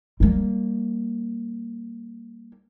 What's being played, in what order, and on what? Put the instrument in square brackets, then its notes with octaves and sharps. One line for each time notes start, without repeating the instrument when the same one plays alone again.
[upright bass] G3 A#3